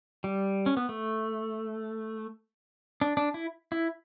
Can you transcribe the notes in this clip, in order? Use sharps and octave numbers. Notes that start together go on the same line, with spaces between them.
G3
C#4
B3
A3
D4
D4
E4
E4